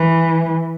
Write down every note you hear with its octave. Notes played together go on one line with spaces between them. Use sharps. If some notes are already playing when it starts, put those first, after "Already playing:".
Already playing: E3